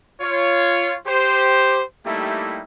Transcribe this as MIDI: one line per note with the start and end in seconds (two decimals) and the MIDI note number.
0.21 0.96 65
0.21 0.96 73
1.07 1.82 67
1.07 1.82 72
2.06 2.62 55
2.06 2.62 57
2.06 2.62 58
2.06 2.62 63
2.06 2.62 64
2.06 2.62 67